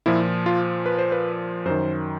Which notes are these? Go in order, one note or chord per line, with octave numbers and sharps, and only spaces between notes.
A#2 F3 E4
F4
B4
C5
B4
F#2 D#3 C5